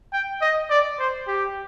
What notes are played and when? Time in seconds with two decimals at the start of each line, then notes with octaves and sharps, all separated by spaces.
0.13 G5
0.42 D#5
0.71 D5
0.99 C5
1.28 G4